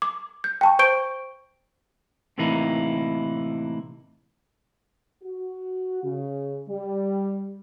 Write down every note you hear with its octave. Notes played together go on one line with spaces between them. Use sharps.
D6
G6
G5 A5 C#6
C5 C#6 G6 D7 G7
A2 C3 E3 A#3 D#4 E4
F#4
C#3
G3